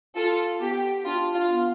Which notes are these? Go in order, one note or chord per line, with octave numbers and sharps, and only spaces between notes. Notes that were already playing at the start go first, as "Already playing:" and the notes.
F4 A4
B3 G4
D4 F4
F4
B3